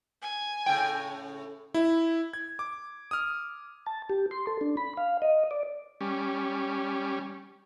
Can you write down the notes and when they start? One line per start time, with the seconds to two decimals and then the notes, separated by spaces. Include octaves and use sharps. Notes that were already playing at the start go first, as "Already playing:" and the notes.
0.22 G#5
0.66 A2 C#3 G5
1.74 E4
2.33 G#6
2.59 D6
3.11 D#6 F6
3.86 A5
4.10 G4
4.31 C6
4.47 A4
4.61 D4
4.77 B5
4.97 F5
5.22 D#5
5.51 D5
6.01 G3 C#4